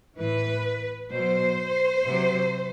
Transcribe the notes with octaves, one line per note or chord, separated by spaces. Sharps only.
A2 E3 B4
B2 F#3 C5
C3 F#3